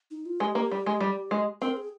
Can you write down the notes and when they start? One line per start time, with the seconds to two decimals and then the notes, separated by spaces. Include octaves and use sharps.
0.11 D#4
0.26 F4
0.40 G#3 G4
0.55 A#3
0.71 G3
0.86 G#3
1.01 G3
1.31 G#3
1.61 C4 A#4
1.77 G#4